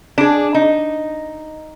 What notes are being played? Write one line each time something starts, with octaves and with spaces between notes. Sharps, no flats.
D4 G#4
D#4